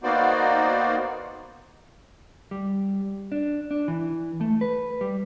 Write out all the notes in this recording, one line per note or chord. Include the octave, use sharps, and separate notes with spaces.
A#3 B3 D#4 F#4 C5 D5
G3
D4
D4
E3
A3
B4
G3